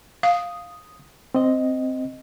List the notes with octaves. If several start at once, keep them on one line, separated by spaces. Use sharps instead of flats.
F5 D#6
C4 D#5